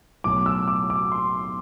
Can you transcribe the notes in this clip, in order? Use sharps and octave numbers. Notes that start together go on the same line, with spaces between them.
B1 A2 F#3 D6
E6
D6
D6
C6